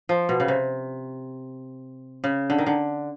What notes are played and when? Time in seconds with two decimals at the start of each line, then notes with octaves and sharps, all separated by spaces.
0.09 F3
0.29 B2
0.40 C#3
0.48 C3
2.24 C#3
2.50 D3
2.58 D#3
2.66 D3